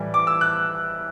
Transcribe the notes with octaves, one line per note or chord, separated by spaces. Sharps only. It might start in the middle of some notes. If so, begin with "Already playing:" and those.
Already playing: A2 E3 G3
D6
E6
F#6